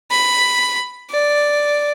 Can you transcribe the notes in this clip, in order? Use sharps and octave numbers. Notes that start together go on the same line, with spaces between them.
B5
D5